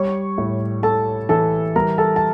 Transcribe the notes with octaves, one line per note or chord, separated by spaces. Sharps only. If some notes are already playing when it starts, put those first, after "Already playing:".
Already playing: G3 C#5 C#6
A2
A2 A4 A5
E3 A4 A5
G3 A#4 A#5
A4 A5
A5